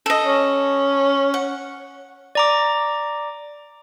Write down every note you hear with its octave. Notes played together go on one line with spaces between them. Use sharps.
A4 D#5
C#4
F#5
D5 A#5 D6